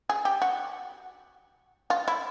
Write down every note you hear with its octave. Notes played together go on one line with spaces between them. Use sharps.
G#4
G4
F#4
F4
E4